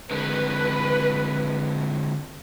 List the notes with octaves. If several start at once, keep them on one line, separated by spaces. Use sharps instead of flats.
D3 G#3 C4 B4